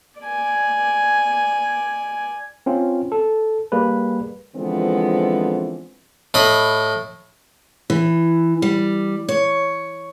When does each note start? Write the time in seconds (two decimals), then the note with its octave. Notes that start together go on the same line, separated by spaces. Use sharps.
0.21 D5 G#5
2.66 C4 C#4 F4
3.12 A4
3.72 G3 A#3 G#4 B4
4.56 D3 E3 F3 G#3 B3 C4
6.34 A2 D#5 B5
7.90 E3
8.62 G3
9.29 C#5